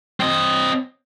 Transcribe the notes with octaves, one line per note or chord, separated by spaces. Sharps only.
C4 D#5